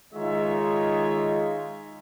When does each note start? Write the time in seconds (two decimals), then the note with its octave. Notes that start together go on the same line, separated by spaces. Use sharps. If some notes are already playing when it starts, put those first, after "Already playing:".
0.13 D#3 G#3 D#4 F4 C#5 E5